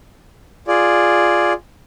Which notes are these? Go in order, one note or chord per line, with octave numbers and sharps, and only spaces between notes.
F4 G#4 D5